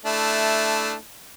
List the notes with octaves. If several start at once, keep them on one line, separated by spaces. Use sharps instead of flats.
A3 D4 E4